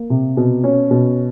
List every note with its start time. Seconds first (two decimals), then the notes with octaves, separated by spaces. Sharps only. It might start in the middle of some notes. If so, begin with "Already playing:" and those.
Already playing: A#3
0.10 C3
0.37 B2
0.64 C#4
0.91 B2